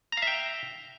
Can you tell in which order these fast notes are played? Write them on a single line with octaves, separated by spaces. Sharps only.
A#5 F5 E5 G5